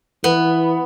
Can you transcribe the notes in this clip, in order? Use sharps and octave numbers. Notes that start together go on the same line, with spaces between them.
E3 B3